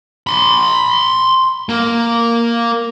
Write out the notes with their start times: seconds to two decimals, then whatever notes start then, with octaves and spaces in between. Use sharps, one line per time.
0.27 B5 C6
1.69 A#3